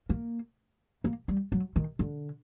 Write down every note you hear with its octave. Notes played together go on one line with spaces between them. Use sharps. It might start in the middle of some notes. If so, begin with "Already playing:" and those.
A#3
A#3
G3
F#3
D#3
D3